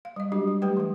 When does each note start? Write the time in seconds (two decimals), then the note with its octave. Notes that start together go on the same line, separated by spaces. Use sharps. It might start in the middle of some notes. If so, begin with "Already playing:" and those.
0.05 F5
0.16 G3 D#5
0.32 F#3 G#3 D4 F#4 G4
0.48 G3
0.62 F#3 A3 G4 B4 G5
0.77 E3 F#3